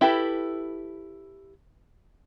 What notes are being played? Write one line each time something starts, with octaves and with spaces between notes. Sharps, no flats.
E4 G4 A4 B4